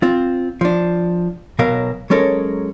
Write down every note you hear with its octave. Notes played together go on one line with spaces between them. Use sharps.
C4 F4
F3 D4
B1 B2 F#3 A#4 F5
F#3 G#3 C#4 A4 A#4